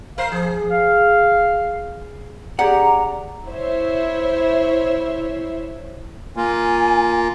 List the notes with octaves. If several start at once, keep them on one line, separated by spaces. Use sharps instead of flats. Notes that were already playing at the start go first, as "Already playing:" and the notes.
A#4 C5 F5
F3 G#4
F5
C#4 G4 G#4 D5 F#5 A#5
E4 C5 C#5 E5
A#3 F4 G#5